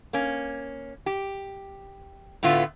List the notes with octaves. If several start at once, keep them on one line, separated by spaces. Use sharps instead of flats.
A#3 C#4
G4
A2 D3 A3 B3 F4